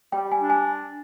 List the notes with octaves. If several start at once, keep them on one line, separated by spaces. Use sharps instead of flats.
G3 G5
G#5
D4
G#5